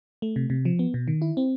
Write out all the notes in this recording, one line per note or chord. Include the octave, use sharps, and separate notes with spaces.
A3
C3
C3
F3
B3
B2
D#3
E4
C4